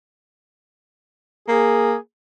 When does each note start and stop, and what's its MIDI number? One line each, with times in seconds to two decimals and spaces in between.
1.48 1.96 58
1.48 1.96 68